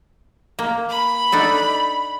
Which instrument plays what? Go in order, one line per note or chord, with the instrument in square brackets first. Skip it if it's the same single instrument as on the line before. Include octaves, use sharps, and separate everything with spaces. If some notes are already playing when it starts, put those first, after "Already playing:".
[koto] A#3
[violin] B5
[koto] D4 D#4 A4